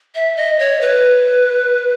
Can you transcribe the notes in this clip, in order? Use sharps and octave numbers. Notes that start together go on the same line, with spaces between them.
E5
D#5
C#5
B4